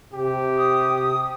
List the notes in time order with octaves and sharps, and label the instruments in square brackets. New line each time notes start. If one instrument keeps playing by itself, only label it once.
[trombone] C3 [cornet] G4
[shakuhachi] D#6